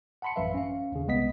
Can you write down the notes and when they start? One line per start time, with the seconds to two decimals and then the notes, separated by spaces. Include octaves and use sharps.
0.22 F#5 A5 B5 C6 C#7
0.36 A1 F#2 F#3 B4 E5 F5
0.54 C#4 F5
0.92 D#2 C#3
1.07 C2 G#3 B3 D#5 B6